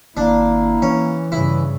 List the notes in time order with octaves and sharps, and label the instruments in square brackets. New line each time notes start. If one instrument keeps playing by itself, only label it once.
[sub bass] G#1 [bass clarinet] A#3 [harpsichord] D4 [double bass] E4
[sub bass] E3 [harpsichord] C#4
[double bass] G2 C#3 [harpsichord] E4